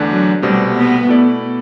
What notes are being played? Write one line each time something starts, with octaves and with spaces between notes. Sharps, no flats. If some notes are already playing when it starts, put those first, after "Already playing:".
Already playing: E2 D3 A3 D4
F#3
C2 B2 G3 A3 C4 G4
B3
B2 A3 E4 A4 D5